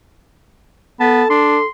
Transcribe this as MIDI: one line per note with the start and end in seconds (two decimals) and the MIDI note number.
1.00 1.24 59
1.00 1.65 69
1.00 1.28 81
1.30 1.58 62
1.30 1.68 84